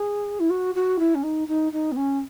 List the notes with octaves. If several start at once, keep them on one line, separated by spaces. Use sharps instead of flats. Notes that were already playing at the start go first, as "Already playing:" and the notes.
Already playing: G#4
E4
F#4
F#4
E4
C#4
D#4
D#4
D#4
B3
C#4